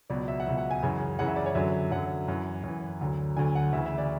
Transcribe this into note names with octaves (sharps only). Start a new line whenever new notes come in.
C#2 B2 F#3 D5
E5
F#5
C#2 B2 F#3 E5
F#5
G#5
F#2 C#3 E3
F#2 C#3 E3 F#5
E5
D5
C#5
F#2 D3 F#3 E5
F#2 D3 F#3 F#5
F#2 E3
F#2 E3
D2 D3 F#3
D2 D3 F#3 G#5
F#5
D2 C#3 E3 E5
E5
D5